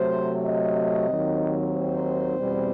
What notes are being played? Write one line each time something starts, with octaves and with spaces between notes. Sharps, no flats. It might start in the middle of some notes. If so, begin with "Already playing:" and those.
Already playing: C3 F#3 A3 C5
D#5
D#2 D#3 F#3 C4
C5
E2 B2 G3 C4